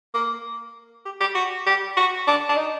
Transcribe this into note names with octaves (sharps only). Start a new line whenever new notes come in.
A#3
G4
G4
F#4
G4
F#4
D4
D4
D#4